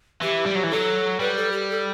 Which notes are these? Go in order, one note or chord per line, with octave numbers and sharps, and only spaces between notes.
E3 G4
G3
F#3
E3
F#3 A4
G3 B4
A4
G4
A4